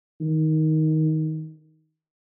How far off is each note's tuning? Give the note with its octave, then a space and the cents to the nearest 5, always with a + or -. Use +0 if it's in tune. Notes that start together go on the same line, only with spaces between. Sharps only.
D#3 +10